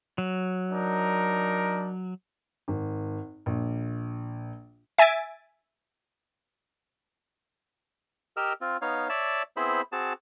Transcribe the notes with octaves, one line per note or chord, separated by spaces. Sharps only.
F#3
D4 D#4 A#4
G#1
A#1
E5 G#5 G#6 A6 D7
G4 A#4 D#5 E6 F6
C4 F4
B3 D#4 C#5 F5
C#5 D5 E5 A5
B3 C4 E4 G#4 C5 B5
C4 F#4 G#4 A5